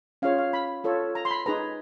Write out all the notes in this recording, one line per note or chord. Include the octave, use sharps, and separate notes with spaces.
C#4 F4 G#4 C#5 F5
F5
B5
F4 A4 C#5
A#5
C6
B5
D#4 G#4 B4 A#5